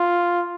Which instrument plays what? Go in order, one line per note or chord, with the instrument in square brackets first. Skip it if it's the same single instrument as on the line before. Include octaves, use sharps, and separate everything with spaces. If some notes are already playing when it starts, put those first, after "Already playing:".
Already playing: [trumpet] F4